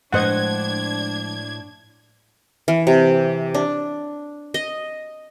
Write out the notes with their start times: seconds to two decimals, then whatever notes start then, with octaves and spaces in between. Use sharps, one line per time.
0.13 A2 F3 G#3 D4 C5 D#5 F#5 G#6
2.68 E3
2.87 C3
3.54 D4
4.54 D#5